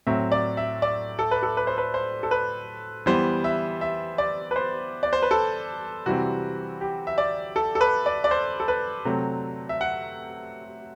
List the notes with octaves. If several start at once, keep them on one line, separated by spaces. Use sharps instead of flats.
A2 F#3 C4 E5
D5
E5
D5
A4
B4
A4
B4
C5
B4
C5
A4
B4
E3 G3 B3 C5
E5
E5
D5
B4
C5
D5
C5
B4
A4
C3 E3 G3 C4 F#4
G4
E5
D5
A4
A4
B4
D5
D5
C5
A4
B4
C3 F#3 A3 C4
E5
F#5